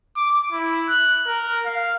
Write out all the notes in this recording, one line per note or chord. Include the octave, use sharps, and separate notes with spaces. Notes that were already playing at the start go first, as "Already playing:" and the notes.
D6
E4
F#6
A#4
F5